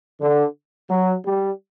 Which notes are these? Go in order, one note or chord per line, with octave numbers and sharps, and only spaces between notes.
D3
F#3
G3